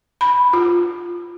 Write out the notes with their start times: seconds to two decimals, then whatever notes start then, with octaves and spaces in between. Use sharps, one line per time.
0.21 B5
0.53 F4